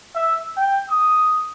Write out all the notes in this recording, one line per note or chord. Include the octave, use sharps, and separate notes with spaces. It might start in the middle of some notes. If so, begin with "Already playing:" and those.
E5
G5
D#6